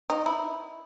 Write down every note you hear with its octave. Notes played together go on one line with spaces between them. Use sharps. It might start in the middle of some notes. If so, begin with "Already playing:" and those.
D#4
E4